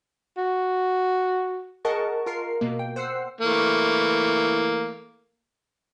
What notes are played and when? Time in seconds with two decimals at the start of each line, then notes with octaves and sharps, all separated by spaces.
0.37 F#4
1.85 G#4 A#4 D#5 F#5 A5 C#6
2.26 F4 A#4 C7
2.61 B2 A#3
2.79 G5
2.96 C5 F#5 E6 C7
3.41 E3 A3 A#3